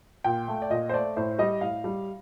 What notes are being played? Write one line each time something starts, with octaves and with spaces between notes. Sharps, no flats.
A#2 G5
A3
D5
A#2 D#5
C5
A3 D5
A2 C5
G3 D#5
A2 F5
G3